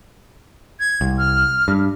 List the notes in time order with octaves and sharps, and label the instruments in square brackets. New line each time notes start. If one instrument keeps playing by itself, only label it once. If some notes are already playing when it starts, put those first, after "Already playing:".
[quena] G#6
[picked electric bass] C2
[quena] F6
[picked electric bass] G2